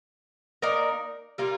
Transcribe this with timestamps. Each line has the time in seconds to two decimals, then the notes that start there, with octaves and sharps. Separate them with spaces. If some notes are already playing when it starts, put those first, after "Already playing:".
0.62 A#3 D#4 A#4 D5
1.38 G3 A#3 F4